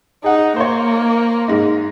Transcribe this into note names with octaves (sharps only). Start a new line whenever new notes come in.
D#4 G#4 F#5
A#3 C5 C#5
G#2 G#3 D#4